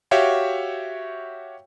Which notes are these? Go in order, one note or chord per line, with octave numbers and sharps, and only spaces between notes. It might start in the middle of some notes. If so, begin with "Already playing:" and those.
F#4 G4 C#5 E5 F5 G5